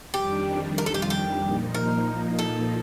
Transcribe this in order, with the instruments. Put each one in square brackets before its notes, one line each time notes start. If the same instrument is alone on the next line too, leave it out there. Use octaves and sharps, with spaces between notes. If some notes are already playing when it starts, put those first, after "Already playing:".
[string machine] F2 D#3 G3 D4 [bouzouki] G4
[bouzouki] A#4
A4
G4
F4
G4
[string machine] A#2 F3 A#3 D#4
[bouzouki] A#4
A4